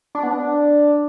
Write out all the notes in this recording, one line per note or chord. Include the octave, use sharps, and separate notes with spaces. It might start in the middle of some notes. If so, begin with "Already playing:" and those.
D4
B3
D4